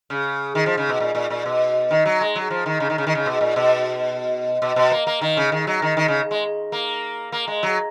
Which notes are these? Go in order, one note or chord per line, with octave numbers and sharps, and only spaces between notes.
C#3
D#3
F3
C#3
B2
A#2
A#2
A#2
B2
D#3
F#3
G#3
F#3
F3
D#3
C#3
D#3
C#3
D#3
C#3
B2
A#2
B2
B2
B2
A#3
A#3
D#3
C#3
D#3
F#3
D#3
D#3
C#3
G#3
A#3
A#3
G#3
F#3